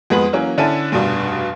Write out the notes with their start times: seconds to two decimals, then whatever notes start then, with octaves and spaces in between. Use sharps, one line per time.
0.10 F2 G#3 B3 B4 F#7
0.33 E3 F#3 A#3 C#4 F#4
0.58 D3 C#4 D4 E4 A5 D#7
0.92 F1 G2 B2 D4